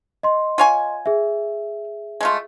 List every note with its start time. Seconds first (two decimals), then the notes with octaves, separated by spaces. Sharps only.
0.23 D#5 C6
0.58 F4 C#5 G#5
1.06 G#4 E5
2.21 G#3 A3 F4